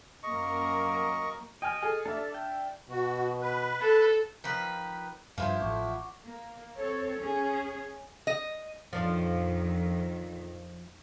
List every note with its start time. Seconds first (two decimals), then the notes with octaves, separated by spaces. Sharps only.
0.23 F#2 A#3 A#4 D#5 C#6
1.62 D#5 G5 G#5 F6
1.82 G#4 A4
2.05 D4 A4 D5 E5 A5
2.34 G5
2.90 B2 F#4
3.41 B4
3.82 A4
4.44 D#3 F3 B4 B6
5.38 G2 F3 E4 F4 B4 C5 F5
5.61 A1 F#5 C#6 D6
6.24 A#3
6.77 C4 A4 C#5
7.20 C#4 G#4
8.27 D#5
8.93 F2 A#2 D#3 F3 D4